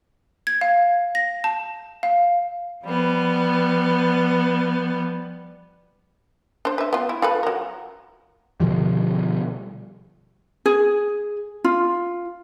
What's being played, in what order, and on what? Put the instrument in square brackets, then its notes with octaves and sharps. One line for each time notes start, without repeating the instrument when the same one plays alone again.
[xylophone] G#6
F5
A#6
A5
F5
[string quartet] F3 G3 B3
[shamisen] D4 C5
B4 E5
B3 F4
E4
F4 A4 B4
F#3 A#4
[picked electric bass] B2 D3 F3 G3
[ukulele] G#4
F4